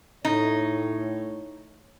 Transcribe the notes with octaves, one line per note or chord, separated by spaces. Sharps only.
A2 D#4 C#5